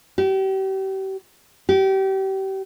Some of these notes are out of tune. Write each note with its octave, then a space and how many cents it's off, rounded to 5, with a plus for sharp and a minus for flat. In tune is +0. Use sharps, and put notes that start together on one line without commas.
G4 -35
G4 -30